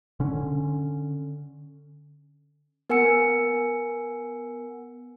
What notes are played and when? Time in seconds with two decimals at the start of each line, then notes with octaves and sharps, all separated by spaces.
0.20 D3 C#4
2.90 B3 A#4 F#5 G#5 E6 C#7